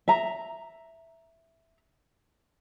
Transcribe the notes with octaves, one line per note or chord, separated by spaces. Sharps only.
E5 A#5